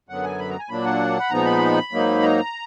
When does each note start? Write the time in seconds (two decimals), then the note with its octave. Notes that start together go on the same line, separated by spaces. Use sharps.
0.09 F#2 D3 F#3 B3 F#5
0.24 G#5
0.39 B5
0.50 A#5
0.59 G#5
0.69 A#2 F#3 A#3 D4 B5
0.85 F#5
1.20 B5
1.30 A#2 F3 G#3 B3 D#4 A#5
1.45 B5
1.92 G#2 F#3 A#3 D#4
2.22 A#5